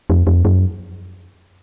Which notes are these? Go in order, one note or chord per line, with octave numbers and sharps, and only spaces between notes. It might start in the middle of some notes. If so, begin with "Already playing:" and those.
F2
F2
F#2